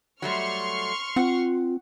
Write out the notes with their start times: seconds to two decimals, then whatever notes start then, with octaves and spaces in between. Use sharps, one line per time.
0.22 F#3 G3 A3 C6 C#6 F6
1.16 C4 F4 F#5